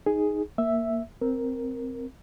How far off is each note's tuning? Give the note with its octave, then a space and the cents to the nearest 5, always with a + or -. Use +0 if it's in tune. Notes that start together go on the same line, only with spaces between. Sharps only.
D#4 +0 G#4 +0
A#3 +0 E5 +0
C4 +0 A#4 +0